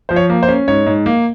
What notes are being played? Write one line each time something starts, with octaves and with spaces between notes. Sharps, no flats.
F3 C5
C#5
A#3
C5
C#4
G#2 C#5
G#2
A#3